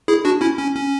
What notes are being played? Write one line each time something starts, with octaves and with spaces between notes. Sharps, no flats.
E4 G#4
D4 F#4
C#4 E4
C#4
C#4